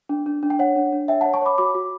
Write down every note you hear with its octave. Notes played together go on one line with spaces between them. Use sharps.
D4
D4
D4
G5
C#5 F#5
D4
D4
C#5 E5 G5
F#5 A5
C#5
A5 C#6
C#5 B5 D6
F#4 B5 D6
F#4